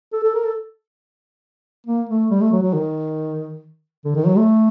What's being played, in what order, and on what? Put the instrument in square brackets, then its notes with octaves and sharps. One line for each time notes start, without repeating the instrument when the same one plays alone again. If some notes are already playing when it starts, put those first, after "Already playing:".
[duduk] A4
A4
A#4
A4
A#3
A3
G3
A3
F#3
F#3
D#3
D3
D#3
F#3
A3